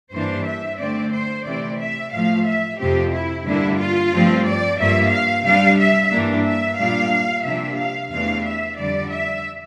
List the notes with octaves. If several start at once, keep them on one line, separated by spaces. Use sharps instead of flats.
G2 E3 A#3 D4 C5
E5
D3 A3 C4 D5
C5
C3 E3 A3 C4 D5
E5
A2 F3 A3 F5
E5
F2 C3 F3 C4 G4
E4
G2 D3 G3 A#3 D4 E4
F4
G2 F3 A3 C4
D5
G2 F3 A#3 E5
F5
C3 G3 D4 F5
E5
G2 E3 A#3 D4
E5
A#2 G3 D4 F5
C3 F3 A#3 D4 E5
F5
E2 C3 E3 A3 D4 F5
E5
F2 D3 G3 D5
E5